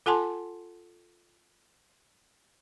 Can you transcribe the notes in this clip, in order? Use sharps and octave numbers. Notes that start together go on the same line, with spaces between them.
F4 A4 F#5 G#5 A5 C6